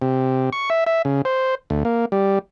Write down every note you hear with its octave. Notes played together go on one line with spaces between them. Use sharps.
C3
C#6
E5
E5
C#3
C5
D2
A#3
G3